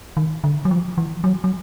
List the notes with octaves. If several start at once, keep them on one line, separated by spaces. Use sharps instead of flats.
D#3
D3
F#3
F3
E3
F#3
F#3